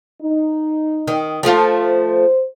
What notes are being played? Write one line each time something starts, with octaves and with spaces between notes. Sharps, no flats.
D#4
D#3
F3 A3 F4
C5